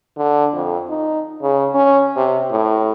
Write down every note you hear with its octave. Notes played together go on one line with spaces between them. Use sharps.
D3
F2
D#4
C#3
C#4
C3
A2